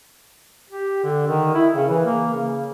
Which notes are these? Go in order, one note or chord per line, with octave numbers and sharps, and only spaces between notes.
G4
D3
D#3
E4
C#3
E3
A#3
C#3